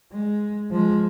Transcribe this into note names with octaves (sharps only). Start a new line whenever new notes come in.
G#3
F3 G#3